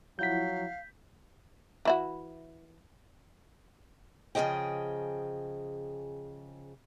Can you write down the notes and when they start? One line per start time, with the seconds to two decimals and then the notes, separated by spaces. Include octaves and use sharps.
0.19 F3 F#3 E4 F5 F#5 G6 B6
1.85 E3 E4 F#4
4.35 C#3 F3 G#4 D#5 G5